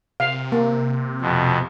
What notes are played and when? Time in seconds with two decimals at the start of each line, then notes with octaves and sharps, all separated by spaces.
0.20 C3 F5
0.52 A#3
1.21 F2 B2